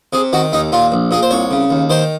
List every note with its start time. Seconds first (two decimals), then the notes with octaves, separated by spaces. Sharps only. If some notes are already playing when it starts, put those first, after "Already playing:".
0.13 C3 G#4
0.33 D#3 F#4
0.52 D#2 D#4
0.72 A#2 F4
0.92 A#1
1.11 A#2 G#4
1.23 C5
1.31 C2 C#5
1.51 C#3
1.70 D#2
1.90 D#3 C5